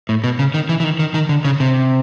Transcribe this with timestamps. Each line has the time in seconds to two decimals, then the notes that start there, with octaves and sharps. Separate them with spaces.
0.09 A2
0.24 B2
0.39 C#3
0.54 D#3
0.69 E3
0.80 E3
0.84 D#3
0.99 D#3
1.14 D#3
1.29 D3
1.45 C#3
1.60 C3